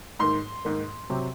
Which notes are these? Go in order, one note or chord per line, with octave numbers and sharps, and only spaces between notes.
G#2 D#3 A#3 C6
G#2 D#3 A#3
C3 F#3 C4